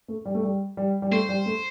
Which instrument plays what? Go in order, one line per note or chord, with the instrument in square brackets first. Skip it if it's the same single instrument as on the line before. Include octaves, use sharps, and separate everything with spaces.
[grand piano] A3
G3
A3
G3
G3
G3
[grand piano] A3 [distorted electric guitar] C5
[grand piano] G3
A3